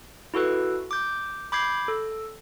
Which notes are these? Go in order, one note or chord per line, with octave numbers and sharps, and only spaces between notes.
E4 F#4 A4 B4
D6 G6
B5 D6 G6 G#6 C7
A4